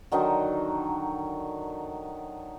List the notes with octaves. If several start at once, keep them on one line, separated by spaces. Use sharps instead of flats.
D3 D#3 F#3 D#4